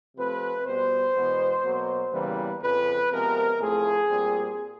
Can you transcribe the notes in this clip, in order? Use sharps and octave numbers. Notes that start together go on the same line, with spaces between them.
C3 F3 A3 C4 B4
B2 G3 B3 C5
E2 B2 G#3 B3
B2 F#3 A#3
E2 C#3 E3 G3 A#3 B4
F2 C#3 F3 B4
C3 F3 G#3 B3 A#4
A2 F3 A3 C4 G#4
A#2 G3 C4